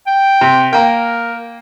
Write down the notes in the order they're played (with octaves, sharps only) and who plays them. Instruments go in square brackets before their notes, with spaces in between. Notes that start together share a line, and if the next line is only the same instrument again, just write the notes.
[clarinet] G5
[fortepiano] C3
[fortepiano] A#3 G5 [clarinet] A#4